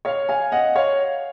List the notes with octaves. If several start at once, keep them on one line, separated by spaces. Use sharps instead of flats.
C#5 F5
F5 G#5
D#5 F#5
C#5 F5